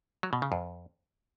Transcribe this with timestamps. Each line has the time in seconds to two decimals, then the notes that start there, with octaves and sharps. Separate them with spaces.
0.23 F#3
0.33 B2
0.42 C#3
0.52 F2